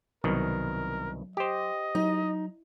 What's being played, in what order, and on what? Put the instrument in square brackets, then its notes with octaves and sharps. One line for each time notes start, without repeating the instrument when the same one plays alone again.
[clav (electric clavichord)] C2 B2 D#3 [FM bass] F#3 [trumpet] A#4
[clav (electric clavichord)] G4 C5 [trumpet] D#5
[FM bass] F#3 [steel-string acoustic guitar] D#4